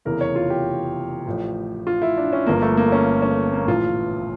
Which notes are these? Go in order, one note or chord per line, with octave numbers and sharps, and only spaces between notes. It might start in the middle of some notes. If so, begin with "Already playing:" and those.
F1 E2 C#3 E3 A#4
C#5
F4
G4
A1 A2 F3
F4
E4
D4
C#4
G1 G2 F3 A#3
A3
A#3
C#4
C#4
A#3
A#1 A2 E3 F4